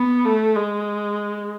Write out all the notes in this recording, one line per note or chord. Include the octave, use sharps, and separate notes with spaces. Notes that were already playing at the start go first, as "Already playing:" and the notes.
Already playing: B3
A3
G#3